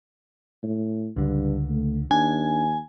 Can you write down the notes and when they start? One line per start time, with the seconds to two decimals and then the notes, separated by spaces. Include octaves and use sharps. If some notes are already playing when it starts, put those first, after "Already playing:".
0.63 A2
1.16 C#2 G2 D3
1.70 A3
2.11 D#2 D4 G#5